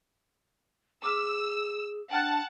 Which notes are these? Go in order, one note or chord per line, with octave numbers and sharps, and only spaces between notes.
G#4 D6 E6 F6 B6
D4 F#5 G5 A5 F6 F#6